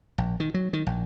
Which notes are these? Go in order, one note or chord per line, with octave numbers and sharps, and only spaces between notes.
A#1
D#3
F#3
D#3
A#1